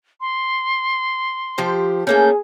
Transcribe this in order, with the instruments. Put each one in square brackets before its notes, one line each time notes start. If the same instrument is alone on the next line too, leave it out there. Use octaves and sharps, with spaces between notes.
[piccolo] C6
[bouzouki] F3 G4 C5
[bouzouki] A3 A#3 C#4 [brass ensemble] G#4 [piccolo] G6